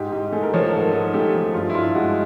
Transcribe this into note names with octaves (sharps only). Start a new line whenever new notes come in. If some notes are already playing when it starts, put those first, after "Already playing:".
Already playing: G#2 G4
G#2
A3 G#4
A#4
F3 C#5
A#4
G#2 A4
G#2
A3 G4
F3
G2 F4
E4
G2 F4
G#3 F#4